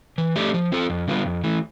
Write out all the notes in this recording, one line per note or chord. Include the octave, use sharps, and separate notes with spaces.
E3
A3 D4 G4
F3
C4 F4 A4
F2
D3 G3 B3 F4
F2
E3 A3